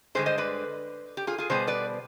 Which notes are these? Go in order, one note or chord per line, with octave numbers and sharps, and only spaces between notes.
G2 D3 G#3 G#4 C5
C5 D#5
B4 D5
G4
F4 G#4
F4 G#4
B2 G3 B3 G#4 C5
B4 D5